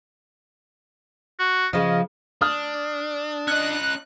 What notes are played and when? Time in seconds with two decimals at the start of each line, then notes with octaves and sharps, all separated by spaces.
1.39 F#4
1.73 C#3 F3 D#5
2.41 D4 D#6 F6
3.48 C#4 D#5 F#6